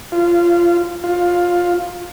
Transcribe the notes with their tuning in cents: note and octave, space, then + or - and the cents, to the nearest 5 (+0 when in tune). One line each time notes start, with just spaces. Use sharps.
F4 -20
F4 +10